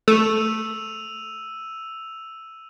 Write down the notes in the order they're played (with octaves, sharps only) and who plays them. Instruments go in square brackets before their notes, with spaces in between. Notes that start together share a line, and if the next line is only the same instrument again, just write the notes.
[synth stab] A3 [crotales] E6 D#7 F7